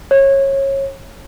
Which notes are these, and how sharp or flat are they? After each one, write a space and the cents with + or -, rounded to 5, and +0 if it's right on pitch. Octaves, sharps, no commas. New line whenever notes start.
C#5 -25